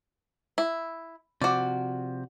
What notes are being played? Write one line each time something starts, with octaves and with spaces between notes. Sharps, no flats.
E4
C3 F3 F#4 D5